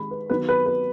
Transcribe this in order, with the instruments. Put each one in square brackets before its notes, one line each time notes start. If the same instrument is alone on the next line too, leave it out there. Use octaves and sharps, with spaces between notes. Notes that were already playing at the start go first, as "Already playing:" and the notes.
Already playing: [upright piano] D#3 G#3 D#4 B5
B4
D#3 F#3 B3 B4
B4
B4